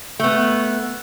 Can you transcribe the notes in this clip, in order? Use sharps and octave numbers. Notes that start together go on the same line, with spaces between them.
A3 B3